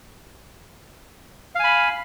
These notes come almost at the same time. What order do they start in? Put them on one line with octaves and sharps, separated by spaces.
F5 G#5 B5